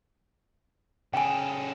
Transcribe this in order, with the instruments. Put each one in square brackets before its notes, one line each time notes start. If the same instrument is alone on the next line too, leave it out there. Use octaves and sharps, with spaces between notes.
[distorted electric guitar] C#3 A4 [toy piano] G5 G#5